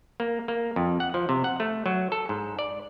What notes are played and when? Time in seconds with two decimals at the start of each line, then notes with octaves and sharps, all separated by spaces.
0.20 A#3
0.48 A#3
0.76 F2
1.00 F#5
1.14 F3
1.29 C3
1.44 F#5
1.60 A3
1.86 F#3
2.12 A4
2.29 G#2
2.59 D5